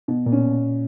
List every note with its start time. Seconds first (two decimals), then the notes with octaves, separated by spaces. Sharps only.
0.08 B2
0.26 A#2
0.32 C#4